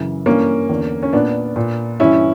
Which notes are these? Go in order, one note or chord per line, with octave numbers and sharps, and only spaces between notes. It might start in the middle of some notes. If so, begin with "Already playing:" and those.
Already playing: F#2 C#3 E3
G2 E3 A#3 C#4
E2 D3
C#4
A#2 B3 D4
A#2
G2 E3 C#4 E4